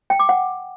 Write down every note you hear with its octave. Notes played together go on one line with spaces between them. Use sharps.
G5
D6
F#5